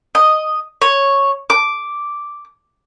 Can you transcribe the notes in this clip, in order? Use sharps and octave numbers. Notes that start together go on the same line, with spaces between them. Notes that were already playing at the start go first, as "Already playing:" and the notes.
D#5
C#5
D6